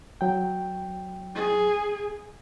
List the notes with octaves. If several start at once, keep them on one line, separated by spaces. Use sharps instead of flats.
F#3 G5
G#4